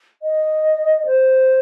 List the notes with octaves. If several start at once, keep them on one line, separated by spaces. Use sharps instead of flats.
D#5
C5